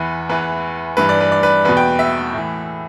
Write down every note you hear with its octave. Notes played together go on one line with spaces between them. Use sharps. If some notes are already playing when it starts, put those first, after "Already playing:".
Already playing: E2 E3 B4
E2 E3 B4
G2 E3 B4
D5
B4
D5
B4
E2 B2 B4
G5
E5
A2
E3